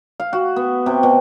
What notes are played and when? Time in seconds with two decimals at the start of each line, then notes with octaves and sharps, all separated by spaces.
0.20 F5
0.33 F#4
0.56 B3
0.86 C3
1.03 B2